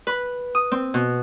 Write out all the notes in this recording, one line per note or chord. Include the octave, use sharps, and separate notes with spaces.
B4
D#6
C4
B2